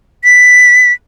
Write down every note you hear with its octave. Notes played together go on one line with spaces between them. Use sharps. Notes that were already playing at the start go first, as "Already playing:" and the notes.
B6